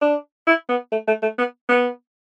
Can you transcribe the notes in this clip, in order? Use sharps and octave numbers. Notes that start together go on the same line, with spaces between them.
D4
E4
B3
A3
A3
A3
B3
B3